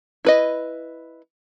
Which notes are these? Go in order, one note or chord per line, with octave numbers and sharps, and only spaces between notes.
E4 B4 D#5